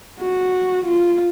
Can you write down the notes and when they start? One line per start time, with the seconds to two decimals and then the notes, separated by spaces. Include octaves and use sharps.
0.21 F#4
0.86 F4